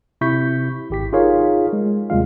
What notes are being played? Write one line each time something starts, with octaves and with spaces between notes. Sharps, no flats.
C3 E4 C#6 G6 B6
G#1 G4 B6
D#4 F4 G#4 A#4 C#5 F5
G#3
D#2 C3 G3 G#3 F4 F5